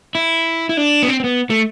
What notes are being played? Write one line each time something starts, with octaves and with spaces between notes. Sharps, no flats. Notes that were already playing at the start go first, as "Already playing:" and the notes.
E4
E4
D4
B3
C4
C4
B3
A3